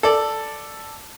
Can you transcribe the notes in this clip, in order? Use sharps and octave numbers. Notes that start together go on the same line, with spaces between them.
A4 D5